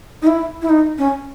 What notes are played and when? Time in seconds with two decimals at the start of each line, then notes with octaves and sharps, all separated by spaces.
0.22 D#4
0.27 E4
0.62 E4
0.69 D#4
0.98 C#4